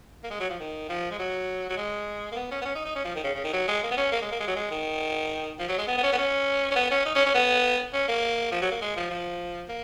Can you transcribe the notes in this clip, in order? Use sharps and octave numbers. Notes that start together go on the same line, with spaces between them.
A#3
G#3
F#3
F3
D#3
F3
G#3
F#3
F#3
G#3
A#3
B3
C#4
B3
C#4
D#4
D#4
C#4
F3
D#3
C#3
C#3
D#3
F#3
G#3
A#3
B3
C#4
A#3
G#3
A#3
G#3
F#3
G#3
D#3
F3
F#3
G#3
B3
B3
C#4
B3
C#4
C#4
B3
C#4
D#4
C#4
C#4
B3
C#4
A#3
F3
F#3
A#3
G#3
F3
F3
A#3